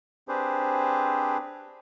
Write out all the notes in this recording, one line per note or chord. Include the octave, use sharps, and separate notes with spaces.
C4 D4 G4 G#4 B4 C5